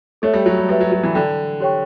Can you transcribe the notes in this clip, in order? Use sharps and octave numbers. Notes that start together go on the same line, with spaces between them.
A3 A4 C#5 E5
G3
F#3
G3
G3 F#4 B4 E5
F#3
F#3
E3
D3 A4 D5 G5
G4 C#5 G5 C#6